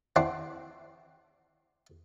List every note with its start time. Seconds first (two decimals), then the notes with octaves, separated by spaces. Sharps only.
0.16 C4 D4 E4 F#5 C6 D6